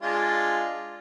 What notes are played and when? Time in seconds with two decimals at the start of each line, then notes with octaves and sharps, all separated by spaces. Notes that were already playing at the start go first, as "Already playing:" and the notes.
0.02 G#3 D4 F4